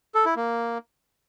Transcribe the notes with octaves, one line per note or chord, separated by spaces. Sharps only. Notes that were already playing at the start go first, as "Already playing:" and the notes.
A4
E4
A#3